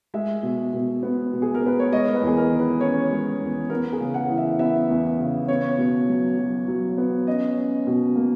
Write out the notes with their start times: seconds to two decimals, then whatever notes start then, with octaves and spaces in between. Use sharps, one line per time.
0.14 G#3 E5
0.43 B2
0.73 B2
1.03 B3
1.33 B2
1.42 G#4
1.54 A#4
1.62 B3 B4
1.80 C#5
1.92 G#3 D#5
2.07 A#4
2.15 B4
2.22 E2
2.27 G#4
2.37 A#4
2.52 D#3
2.59 B4
2.81 C#4 C#5
3.11 G#3
3.41 E2
3.70 B3 A#4
3.92 G#4
4.00 C#3
4.14 F#5
4.30 E3
4.38 E5
4.59 B3 E5
4.90 E2
5.20 C#3
5.48 B3 C#5
5.78 B2
6.08 F#3
6.38 F#3
6.68 F#3
6.98 B3
7.27 C#4 D#5
7.57 C#4
7.87 B2
8.16 A#3